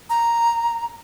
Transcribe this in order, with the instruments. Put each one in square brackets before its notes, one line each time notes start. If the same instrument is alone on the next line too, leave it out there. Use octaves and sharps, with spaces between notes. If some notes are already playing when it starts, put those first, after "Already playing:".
[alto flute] A#5